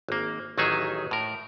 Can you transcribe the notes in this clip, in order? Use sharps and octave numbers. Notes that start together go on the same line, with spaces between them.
G#1 A#3
A1 D#3 F#3 D#4 G#4 E5
A2 A#4